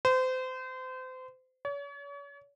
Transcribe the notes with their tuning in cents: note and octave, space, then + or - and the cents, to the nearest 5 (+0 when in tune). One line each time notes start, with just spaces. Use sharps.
C5 -30
C#5 +40